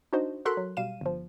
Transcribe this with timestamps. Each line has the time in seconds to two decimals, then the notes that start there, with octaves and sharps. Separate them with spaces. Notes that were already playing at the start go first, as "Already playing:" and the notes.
0.13 D4 D#4 F#4 C5 D#5
0.45 F#4 A4 A#4 C6 F#6 B6
0.57 F#3
0.77 B2 G3 F5 D#7 E7
1.01 G1 F3